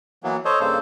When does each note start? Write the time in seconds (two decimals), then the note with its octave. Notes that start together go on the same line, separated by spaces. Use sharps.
0.24 E3 F#3 A#3 B3
0.45 A4 C5 C#5 D#5
0.60 G2 C#3 A#3 A4 C5